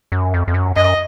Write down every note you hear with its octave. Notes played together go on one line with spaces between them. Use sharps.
F#2
F2
F2
F#2
F#2 D#5